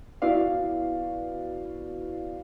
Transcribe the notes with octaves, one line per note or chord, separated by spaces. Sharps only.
B3 E4 F#4 B4 D5 F5